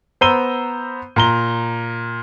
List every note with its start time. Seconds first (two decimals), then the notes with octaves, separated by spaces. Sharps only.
0.21 B3 C5 A#5 E6 D#7 G7
1.16 A#2 A#5 G7